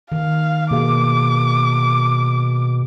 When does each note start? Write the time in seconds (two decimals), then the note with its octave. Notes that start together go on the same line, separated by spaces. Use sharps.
0.12 D#3 F5
0.71 B2 A#3 G#4 F5 D6